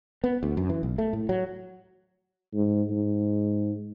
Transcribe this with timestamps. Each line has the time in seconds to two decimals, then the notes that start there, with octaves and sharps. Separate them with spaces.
0.24 B3
0.43 D2
0.57 F#2
0.69 E3
0.83 B1
0.98 A3
1.13 A2
1.29 F#3
2.54 G#2
2.90 G#2